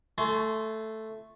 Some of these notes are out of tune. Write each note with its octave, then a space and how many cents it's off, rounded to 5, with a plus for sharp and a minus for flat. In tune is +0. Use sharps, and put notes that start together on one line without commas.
A3 +0 G#5 +40 C6 -10